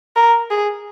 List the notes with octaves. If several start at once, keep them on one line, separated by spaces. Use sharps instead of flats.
A#4
G#4